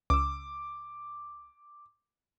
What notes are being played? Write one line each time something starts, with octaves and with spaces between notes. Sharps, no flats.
C#2 D6 E6